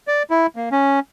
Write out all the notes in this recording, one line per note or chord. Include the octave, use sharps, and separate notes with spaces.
D5
E4
A#3
C#4